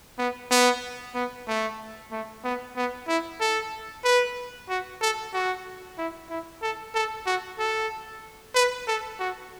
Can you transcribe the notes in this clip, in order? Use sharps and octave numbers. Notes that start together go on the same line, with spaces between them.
B3
B3
B3
A3
A3
B3
B3
E4
A4
B4
F#4
A4
F#4
E4
E4
A4
A4
F#4
A4
B4
A4
F#4